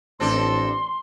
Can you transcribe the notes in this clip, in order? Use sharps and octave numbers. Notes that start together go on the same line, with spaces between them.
A1 C4 D4 A4 C6